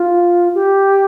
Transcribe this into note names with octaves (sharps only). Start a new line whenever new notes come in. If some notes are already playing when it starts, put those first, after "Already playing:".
Already playing: F4
G4